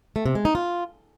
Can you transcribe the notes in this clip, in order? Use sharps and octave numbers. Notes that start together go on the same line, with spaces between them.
A3
C3
G#3
D#4
F4